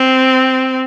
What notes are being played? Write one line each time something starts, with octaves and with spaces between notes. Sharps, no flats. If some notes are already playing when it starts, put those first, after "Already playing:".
Already playing: C4